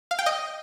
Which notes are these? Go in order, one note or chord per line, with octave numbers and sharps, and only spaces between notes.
F5
G5
D#5